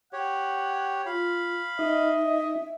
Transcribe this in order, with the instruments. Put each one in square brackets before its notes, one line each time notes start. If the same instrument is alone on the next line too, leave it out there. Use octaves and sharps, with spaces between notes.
[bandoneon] G4 C#5 [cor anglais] F#5
[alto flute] F4 [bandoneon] F5 B5
[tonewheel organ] D#4 [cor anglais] D#5 [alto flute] E5